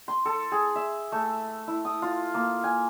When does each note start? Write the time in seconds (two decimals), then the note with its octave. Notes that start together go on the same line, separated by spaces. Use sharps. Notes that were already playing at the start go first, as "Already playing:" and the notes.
0.08 C6
0.25 A4
0.52 G#4
0.75 E5
1.12 A3
1.67 E4
1.85 D#6
2.02 F4
2.34 A#3
2.64 G#5